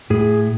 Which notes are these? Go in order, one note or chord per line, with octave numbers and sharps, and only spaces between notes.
A2 G#4